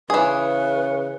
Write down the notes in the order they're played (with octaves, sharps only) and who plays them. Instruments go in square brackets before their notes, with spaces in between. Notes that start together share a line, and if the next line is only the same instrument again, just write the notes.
[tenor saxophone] C#3 [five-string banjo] E3 G#4 [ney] B4